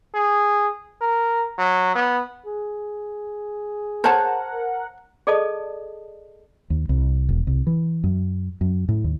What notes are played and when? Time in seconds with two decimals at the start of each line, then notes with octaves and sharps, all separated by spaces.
0.15 G#4
1.02 A#4
1.59 F#3
1.95 B3
2.46 G#4
4.04 A#4 C5 C#5 F#5 A5
5.27 G#4 A4 D5 D#5 A5 D#6
6.70 D#2
6.89 C2
7.29 E1
7.47 C2
7.67 E3
8.04 F#2
8.61 F#2
8.89 A2
9.04 D#2